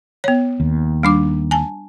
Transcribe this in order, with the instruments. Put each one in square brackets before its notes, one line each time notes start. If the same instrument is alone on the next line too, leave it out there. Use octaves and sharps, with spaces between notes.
[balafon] B3 C#5
[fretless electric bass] D#2
[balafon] G3 D4 D6
G#5 A5